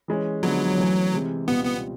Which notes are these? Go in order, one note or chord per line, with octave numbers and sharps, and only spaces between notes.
E3 G#3 C#4
D3 F3 F#3 G#3 B3
E3 A3 C#4
C3 E3 G#3
C#2 B2 G3 B3 C4 F4
B3